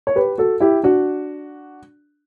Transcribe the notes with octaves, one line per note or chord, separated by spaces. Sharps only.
C#5
G4 B4
F#4 A4
E4 G4
D4 F#4